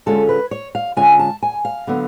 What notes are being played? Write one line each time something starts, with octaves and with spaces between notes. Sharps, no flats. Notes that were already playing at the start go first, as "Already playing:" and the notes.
D3 G#3 C#4 F4 A4
B4
C#5
F5
D3 G#3 C#4 F4 G#5
A5
G#5
F5
D3 F#3 B3